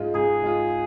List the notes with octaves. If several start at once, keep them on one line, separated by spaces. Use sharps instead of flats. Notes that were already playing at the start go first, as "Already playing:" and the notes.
Already playing: G#2 G#3 F4
G#2 G#4
G#3 F4